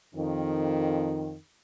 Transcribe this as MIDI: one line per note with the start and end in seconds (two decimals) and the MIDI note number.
0.15 1.36 41
0.15 1.36 51